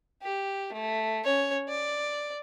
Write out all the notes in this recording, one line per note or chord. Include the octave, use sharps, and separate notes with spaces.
G4
A3
C#4 C#5
D5